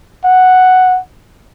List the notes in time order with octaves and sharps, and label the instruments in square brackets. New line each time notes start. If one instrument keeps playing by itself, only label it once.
[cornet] F#5